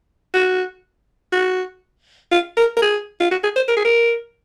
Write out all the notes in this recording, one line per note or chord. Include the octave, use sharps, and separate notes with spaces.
F#4
F#4
F4
A#4
A#4
G#4
F4
F#4
G#4
C5
A#4
G#4
A#4